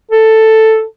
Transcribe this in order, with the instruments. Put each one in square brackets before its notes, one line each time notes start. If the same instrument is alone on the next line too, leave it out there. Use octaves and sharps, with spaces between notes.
[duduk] A4